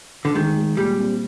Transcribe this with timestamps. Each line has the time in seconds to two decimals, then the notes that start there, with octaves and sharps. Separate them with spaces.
0.25 D3
0.34 D#3 G#3
0.56 G#3
0.77 A#2 G3
0.98 C4